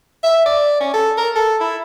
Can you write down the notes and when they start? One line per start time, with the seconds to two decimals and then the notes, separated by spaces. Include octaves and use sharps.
0.23 E5
0.46 D5
0.81 C#4
0.94 A4
1.18 A#4
1.36 A4
1.61 E4